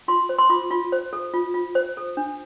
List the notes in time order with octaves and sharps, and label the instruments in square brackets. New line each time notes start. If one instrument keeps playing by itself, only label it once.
[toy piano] F4 C6
C5
C6
F4 D6
F4
C5
A4
F4
F4
C5
A4
D4